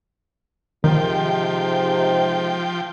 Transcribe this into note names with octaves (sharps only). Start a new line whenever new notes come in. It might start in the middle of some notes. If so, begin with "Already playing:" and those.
G#2 C3 D#3 F3 G5